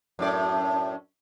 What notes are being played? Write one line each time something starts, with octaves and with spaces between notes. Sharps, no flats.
F#2 A2 D5